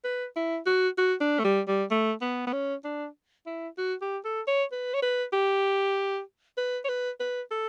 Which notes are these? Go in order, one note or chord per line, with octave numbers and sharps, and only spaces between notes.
B4
E4
F#4
F#4
D4
A3
G3
G3
A3
B3
B3
C#4
D4
E4
F#4
G4
A4
C#5
B4
C#5
B4
G4
B4
C#5
B4
B4
A4